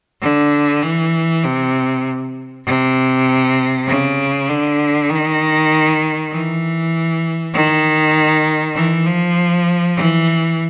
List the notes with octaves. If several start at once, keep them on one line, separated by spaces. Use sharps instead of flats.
D3
E3
C3
C3
C#3
D3
D#3
E3
D#3
E3
F3
E3